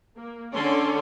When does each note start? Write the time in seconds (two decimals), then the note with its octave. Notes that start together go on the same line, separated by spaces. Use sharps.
0.16 A#3
0.53 D3 C#4 A4 C#5 D5 C6